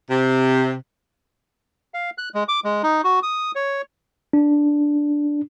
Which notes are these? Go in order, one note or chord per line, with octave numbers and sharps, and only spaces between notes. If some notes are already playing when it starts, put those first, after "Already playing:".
C3
F5
F#6
G#3
D6
G#3
D#4
F#4
D#6
C#5
D4